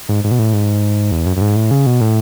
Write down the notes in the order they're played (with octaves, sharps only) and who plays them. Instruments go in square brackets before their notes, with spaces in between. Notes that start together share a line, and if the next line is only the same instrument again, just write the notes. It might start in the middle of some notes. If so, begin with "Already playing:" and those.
[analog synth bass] G#2
G#2
B2
A2
G#2
E2
F#2
F#2
G#2
A2
C#3
B2
A2